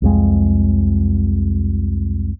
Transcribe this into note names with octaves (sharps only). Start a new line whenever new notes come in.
C2 F2 G#3